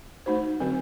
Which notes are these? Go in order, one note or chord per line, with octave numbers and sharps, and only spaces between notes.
A3 D#4 F#4 C5
D3 F#3 C4 F#4